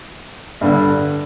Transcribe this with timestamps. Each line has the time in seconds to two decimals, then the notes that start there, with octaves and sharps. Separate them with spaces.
0.61 G2 D3